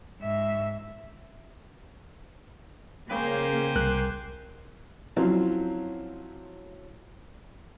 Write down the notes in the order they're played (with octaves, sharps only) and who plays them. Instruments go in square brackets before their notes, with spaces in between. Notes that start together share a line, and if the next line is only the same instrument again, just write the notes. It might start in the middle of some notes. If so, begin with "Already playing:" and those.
[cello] G#2 E5
[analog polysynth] C#3 [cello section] A#3 [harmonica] G4 C5 G#5
[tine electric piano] C2 A#4 F#6
[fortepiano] F3 F#3 C4 C#4 E4